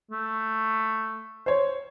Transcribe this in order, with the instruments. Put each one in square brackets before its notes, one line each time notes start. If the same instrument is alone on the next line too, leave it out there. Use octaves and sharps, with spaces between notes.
[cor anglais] A3
[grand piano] C5 C#5